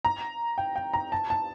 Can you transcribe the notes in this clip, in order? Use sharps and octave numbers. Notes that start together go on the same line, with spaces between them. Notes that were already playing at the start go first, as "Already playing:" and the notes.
A#5
G5
G5
A#5
A5
A5